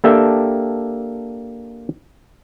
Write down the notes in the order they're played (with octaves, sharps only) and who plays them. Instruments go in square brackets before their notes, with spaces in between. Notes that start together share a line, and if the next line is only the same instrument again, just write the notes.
[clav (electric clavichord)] A#3 D4 G4 A4 E5 G5